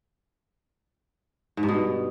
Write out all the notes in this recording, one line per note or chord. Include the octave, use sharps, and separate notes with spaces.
G#2
G2
B2